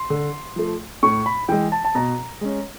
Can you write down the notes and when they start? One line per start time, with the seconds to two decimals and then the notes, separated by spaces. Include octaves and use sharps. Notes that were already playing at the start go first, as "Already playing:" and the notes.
Already playing: C6
0.10 D3
0.56 F3 A3
1.03 A2 C#6
1.26 B5
1.48 E3 G#3 G5
1.72 A5
1.85 A5
1.95 B2 A#5
2.41 G#3 C#4